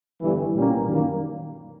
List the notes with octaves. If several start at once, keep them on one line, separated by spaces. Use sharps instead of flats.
G1 G2 E3
B1 A#2 G3 A#3 C#4
F#2 D#3 G3 A#3